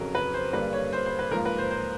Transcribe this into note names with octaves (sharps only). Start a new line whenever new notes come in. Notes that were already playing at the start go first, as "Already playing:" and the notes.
Already playing: F2 C#3 F#3 A#4
B4
C5
G2 D3 G3 A#3 B4
C#5
C5
C5
B4
G#2 F3 A#3 A#4
B4
C5
C5